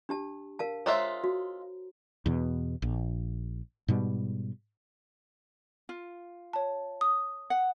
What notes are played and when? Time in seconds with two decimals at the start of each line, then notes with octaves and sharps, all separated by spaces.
0.09 D4 G4 A5
0.59 A#4 F5 A5
0.86 G#3 F4 C5 C#5 E5 A#5
1.24 F#4
2.26 E2 B2
2.82 A#1
3.88 G#2 B2 G3
5.89 F4
6.53 C#5 A5
7.01 D#6
7.50 F#5